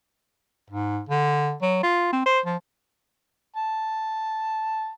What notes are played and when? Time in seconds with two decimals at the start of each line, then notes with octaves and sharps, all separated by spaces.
0.70 G#2
1.09 D3
1.62 F#3
1.83 F4
2.13 C4
2.26 C5
2.46 F3
3.56 A5